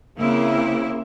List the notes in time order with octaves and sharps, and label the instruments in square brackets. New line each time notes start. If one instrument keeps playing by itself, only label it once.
[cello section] C#3 A#3 C4 E4